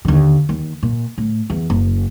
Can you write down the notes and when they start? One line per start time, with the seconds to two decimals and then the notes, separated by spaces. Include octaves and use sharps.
0.05 D#2 D3
0.49 D#2
0.83 A#2
1.18 A2
1.50 E2
1.70 F#1